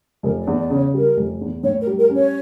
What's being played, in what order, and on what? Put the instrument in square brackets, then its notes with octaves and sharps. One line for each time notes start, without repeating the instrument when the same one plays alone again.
[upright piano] F1 [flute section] A#4
[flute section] D5
[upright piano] E2
[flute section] D5
[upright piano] C#3 [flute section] D5
[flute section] C#5
[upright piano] G3 [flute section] A#4
[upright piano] F1
E2
[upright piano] A2 [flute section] C#5
[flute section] A#4
[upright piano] G3
[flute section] A#4
[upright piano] C#4
[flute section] C#5